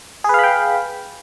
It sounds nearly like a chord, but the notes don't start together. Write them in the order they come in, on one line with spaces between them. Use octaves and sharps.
G#4 B4 F5 B5 G5